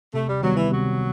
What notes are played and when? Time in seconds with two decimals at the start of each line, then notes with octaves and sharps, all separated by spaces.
0.14 C3 A3
0.29 G3
0.42 D#3 F#3 G3 B3
0.56 E3
0.71 C3 F#3